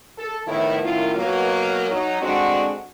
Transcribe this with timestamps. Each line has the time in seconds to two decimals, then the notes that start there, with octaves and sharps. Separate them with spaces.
0.18 A4
0.47 F2 A2 D#3 B3 E4
0.83 F#2 A2 D#3 E4 F4
1.16 B2 F#3 A#3
1.91 F#3 D#4
2.21 D3 G#3 C4 D4 F#4